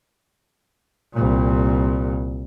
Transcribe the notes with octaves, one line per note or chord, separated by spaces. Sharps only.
C2 A#2